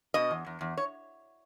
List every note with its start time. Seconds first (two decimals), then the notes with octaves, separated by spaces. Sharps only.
0.14 B2 D#5
0.31 E2
0.46 E2
0.61 E2
0.77 C#5